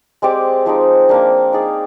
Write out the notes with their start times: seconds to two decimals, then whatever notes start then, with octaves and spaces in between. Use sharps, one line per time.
0.22 G#3 C4 G4 D5
0.66 F3 G#3 D#4
1.09 F3 A#3 D4
1.53 D#4 G#4 D5 F5